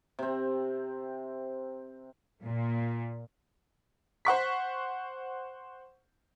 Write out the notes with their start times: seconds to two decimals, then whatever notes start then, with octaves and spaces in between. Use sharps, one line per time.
0.19 C3 C4
2.42 A#2
4.25 C5 F#5 C#6 B6